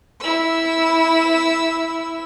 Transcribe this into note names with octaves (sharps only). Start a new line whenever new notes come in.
E4 E6